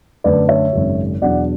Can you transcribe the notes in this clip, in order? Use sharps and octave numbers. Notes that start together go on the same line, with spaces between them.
F#2 D3 A3 D4 B4 D5
C#5 E5
G#1 F#2 C#3
E2 B2 F#3 B3 D4 D5 F#5